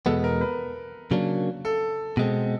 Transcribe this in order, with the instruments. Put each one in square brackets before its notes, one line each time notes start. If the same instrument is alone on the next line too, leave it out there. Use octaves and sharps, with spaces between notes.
[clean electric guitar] E2 B2 G#3 B3 [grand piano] A4
[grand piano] A#4
B4
[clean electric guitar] C#3 F#3 A#3 D4
[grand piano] A4
[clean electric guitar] B2 G#3 C4